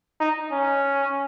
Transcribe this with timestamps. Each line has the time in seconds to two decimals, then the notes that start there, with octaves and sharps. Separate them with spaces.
0.20 D#4
0.52 C#4